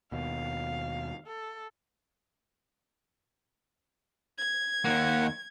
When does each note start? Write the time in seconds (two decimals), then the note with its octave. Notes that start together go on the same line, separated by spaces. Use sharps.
0.12 D#2 B2 F5
1.26 A4
4.38 G#6
4.85 D#2 A#3 F#5